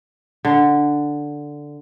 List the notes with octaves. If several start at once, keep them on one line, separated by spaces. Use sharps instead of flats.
D3